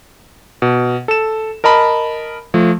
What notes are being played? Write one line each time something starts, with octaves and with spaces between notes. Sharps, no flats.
B2
A4 E7
A#4 D#5 A5 B5
F3 A3